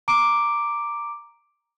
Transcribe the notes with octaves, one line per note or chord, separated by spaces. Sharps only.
A#5 D6 D7